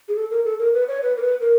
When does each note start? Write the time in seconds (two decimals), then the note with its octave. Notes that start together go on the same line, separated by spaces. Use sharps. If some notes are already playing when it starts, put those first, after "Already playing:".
0.08 G#4
0.16 A4
0.31 A#4
0.45 A4
0.59 A#4
0.74 B4
0.88 C#5
1.02 B4
1.17 A#4
1.22 B4
1.41 A#4